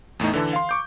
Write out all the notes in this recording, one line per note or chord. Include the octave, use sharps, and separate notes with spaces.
E2 A2 A3 D#4
D3 E3 A4
F5 C6
C#6 D6 G6